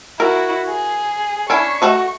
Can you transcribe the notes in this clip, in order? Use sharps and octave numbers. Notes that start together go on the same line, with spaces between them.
E4 F#4 A#4
G#4
C#4 D4 E4 C#6
A3 F#4 D#5